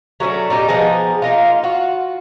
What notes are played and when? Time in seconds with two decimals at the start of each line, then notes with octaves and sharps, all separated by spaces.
0.20 F#3 A3 C#4 D4
0.50 A#2 G3 D#4 G4
0.68 F3 B3 D#4 G#4
1.22 A#3 D#4 F4
1.63 F4 F#4